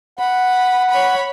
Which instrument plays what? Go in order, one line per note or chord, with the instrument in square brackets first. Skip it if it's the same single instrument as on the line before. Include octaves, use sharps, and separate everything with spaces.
[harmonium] F#5 [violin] B5
[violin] C#5 B5